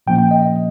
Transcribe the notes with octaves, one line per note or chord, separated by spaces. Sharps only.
A#2 F3 A#3 C#4 G5
G5
D#5
D#5